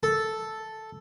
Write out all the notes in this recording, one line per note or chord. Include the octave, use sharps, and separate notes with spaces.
A4